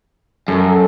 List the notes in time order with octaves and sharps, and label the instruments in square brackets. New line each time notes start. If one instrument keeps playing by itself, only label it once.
[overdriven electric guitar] F#2 [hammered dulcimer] A4